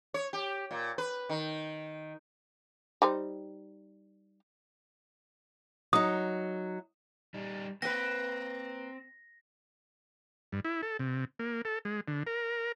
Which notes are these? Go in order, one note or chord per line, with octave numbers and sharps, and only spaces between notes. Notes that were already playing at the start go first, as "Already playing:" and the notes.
C#5
G4
A#2
B4
D#3
G3 D#4 C5
F#3 D#4 D#6
G3 D#4
A#3 C4 B4 A#6
G2
E4
A4
C3
A#3
A4
G#3
D3
A#4